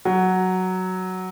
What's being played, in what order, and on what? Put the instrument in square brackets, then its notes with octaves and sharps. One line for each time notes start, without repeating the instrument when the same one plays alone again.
[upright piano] F#3